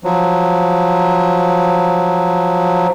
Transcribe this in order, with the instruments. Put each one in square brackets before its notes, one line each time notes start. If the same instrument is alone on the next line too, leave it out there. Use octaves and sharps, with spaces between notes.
[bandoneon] F3 F#3